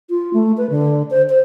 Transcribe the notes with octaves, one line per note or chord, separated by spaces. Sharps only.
F4
A3
B4
D3
C5
C5